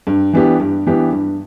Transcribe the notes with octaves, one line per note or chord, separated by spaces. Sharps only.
G2
E3 B3 D4 G4
G2
E3 B3 D4 G4
G2